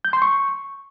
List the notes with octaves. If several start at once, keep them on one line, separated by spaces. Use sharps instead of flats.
G6
C6
C#6